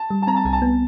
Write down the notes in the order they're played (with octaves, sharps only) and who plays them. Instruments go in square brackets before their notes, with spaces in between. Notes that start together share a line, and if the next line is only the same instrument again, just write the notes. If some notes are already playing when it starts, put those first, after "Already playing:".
Already playing: [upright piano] A5
[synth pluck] G3
[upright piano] A5
[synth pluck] C4 [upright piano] A#5
[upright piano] A5
[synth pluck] C2 [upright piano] G#5
[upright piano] A5
[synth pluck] B3